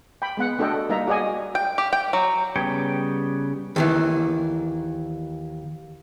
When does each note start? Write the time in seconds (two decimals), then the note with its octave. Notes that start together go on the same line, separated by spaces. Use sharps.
0.22 G5 B5
0.37 G#3 B3 F#5
0.58 A3 D4 F#4 A4 D#5 G5
0.89 G3 A#3 D#4 E5 A#5
1.07 F#4 G#4 D5 D#5 G#5
1.55 G5
1.78 G4
1.93 G5
2.13 F#3
2.56 C#3 G3 B3 C#5 G5
3.76 D#2 D#3 E3